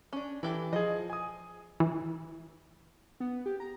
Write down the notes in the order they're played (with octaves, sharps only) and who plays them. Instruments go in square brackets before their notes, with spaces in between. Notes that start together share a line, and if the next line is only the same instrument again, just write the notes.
[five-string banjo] C#4 D4
[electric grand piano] E3 [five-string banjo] E4 G4 A4
[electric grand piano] F3 G#4 [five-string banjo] D#5
[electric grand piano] G#5 D#6
[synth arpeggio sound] E3
[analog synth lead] B3
G4
A#5